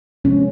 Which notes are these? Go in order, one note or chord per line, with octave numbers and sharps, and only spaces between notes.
C3 F3 G#3 B3 C#4